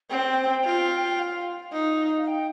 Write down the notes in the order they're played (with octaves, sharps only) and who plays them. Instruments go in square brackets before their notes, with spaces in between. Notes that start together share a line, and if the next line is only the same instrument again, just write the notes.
[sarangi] C4 [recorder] G5
[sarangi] F4
[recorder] G5
F5
[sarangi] D#4
[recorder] F5
G5